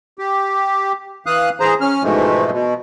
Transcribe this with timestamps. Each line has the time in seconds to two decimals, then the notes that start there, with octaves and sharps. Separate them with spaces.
0.19 G4
1.26 E3 F5 D#6 F#6
1.60 E3 G#4 C5 A#5
1.81 C#4 F6
2.03 G#2 B2 E3 F3 G#3 A3
2.52 B2